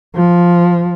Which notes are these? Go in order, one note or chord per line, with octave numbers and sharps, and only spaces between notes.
F3